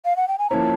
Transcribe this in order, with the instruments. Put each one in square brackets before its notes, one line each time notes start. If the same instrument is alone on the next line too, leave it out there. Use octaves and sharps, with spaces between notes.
[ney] F5
F#5
G5
G#5
[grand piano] F3 A#3 C#4 E4 [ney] A5 A#5